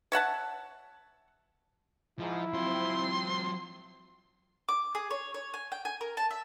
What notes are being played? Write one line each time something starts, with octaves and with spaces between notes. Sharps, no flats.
C#5 E5 F#5 A5
G#2 F3 E4
F#3 C4 F4 C6
D6
G#4
C#5
C#5
G#5
G5
G#5
A#4
A5
E5